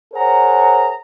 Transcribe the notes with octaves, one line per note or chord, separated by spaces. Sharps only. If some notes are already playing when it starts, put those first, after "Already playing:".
G#4 A#4 C5 C#5 F#5 A#5